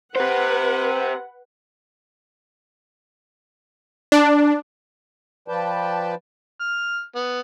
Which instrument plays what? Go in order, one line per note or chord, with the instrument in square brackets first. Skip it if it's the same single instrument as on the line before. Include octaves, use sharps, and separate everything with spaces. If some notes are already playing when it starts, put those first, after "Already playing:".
[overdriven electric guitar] G4 C5 [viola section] B4 F#5
[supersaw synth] D4
[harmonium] F3 B4 D5 G5 A5
[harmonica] F6
B3